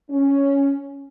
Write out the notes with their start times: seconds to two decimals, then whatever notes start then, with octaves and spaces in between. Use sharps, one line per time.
0.10 C#4